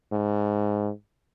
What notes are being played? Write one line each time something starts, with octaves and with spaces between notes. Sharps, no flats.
G#2